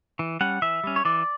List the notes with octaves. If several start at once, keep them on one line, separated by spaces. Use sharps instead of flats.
E3
G3 C#4 F#5
E3 E5
G3 C#4
C#5
E3 D5